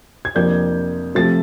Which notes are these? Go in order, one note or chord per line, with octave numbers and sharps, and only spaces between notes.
G#6
F2 C3 F3 A#3 D4 G6
C3 F3 A3 A6